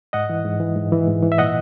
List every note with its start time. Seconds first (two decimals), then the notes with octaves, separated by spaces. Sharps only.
0.13 G#2 D#5 F#5
0.30 E3
0.45 G#2
0.60 E3
0.76 G#2
0.92 E3
1.08 G#2
1.22 E3
1.32 E5
1.38 A#2 D#5 F#5